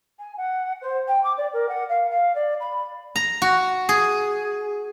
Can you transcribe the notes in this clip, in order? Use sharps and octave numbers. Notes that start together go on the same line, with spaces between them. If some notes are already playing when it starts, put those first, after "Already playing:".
G#5
F#5
C5
G5
D6
D5
A#4
F#5
F5
F5
D5
B5
A#5
F#4
G#4